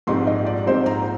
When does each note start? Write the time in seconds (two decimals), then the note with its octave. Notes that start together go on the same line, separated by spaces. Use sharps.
0.07 A#1 G#2 G3 C4 D#4 C6
0.27 D#5
0.46 D5
0.66 A#1 G#2 G3 C4 D#4 C5
0.86 A#5